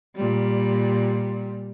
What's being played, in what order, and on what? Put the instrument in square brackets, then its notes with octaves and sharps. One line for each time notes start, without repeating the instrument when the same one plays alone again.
[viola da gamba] A#2 G3